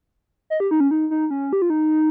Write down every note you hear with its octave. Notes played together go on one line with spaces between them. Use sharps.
D#5
G4
D#4
C#4
D#4
D#4
C#4
G4
F4
D#4